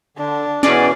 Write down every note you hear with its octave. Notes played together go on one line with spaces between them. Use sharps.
D3 D4
B2 E3 C#4 G#4 D5